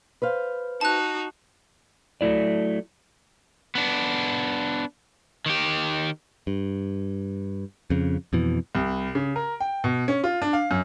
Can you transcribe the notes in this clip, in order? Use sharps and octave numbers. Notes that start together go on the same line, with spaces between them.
B4 C5 F5
D#4 F#4 A5 F#6
F#3 A3 E4 D5
B3 D4
D#3 G4
G2
F2 C#3
F2 B2 E3
C2
C#3
A#4
G5
B2
C#4
F4
D4
F5
F#2